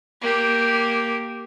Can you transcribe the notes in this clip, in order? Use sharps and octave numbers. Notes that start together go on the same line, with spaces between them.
A#3 G4